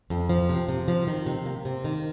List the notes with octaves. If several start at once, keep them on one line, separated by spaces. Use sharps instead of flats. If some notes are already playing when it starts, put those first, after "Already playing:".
F2
F3
C3
C3
F3
D#3
C3
A#3
C3
D#3